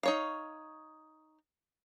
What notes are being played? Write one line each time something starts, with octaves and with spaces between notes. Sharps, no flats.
D#4 C#5 F5